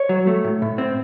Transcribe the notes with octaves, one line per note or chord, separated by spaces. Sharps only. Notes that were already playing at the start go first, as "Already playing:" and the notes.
Already playing: C#5
F#3
A3
A2
A2
C4